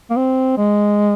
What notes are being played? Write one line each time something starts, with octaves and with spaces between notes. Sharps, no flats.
A#3
C4
G#3